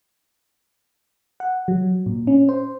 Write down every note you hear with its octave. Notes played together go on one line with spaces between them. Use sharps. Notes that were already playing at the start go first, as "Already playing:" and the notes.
F#5
F#3
A#2
C#4
C5